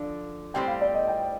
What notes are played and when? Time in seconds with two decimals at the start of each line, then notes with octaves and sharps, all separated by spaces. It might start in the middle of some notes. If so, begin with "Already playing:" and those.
Already playing: D3 F3
0.54 A2 G3 C4 G4 C5 G5
0.68 F5
0.81 D5
0.95 D#5
1.08 G5